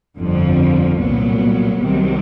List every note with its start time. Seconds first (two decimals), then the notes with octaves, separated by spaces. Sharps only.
0.18 G1 F2 D3 F3
0.98 C2 A#2 F#3 B3
1.80 C2 C3 D#3 F#3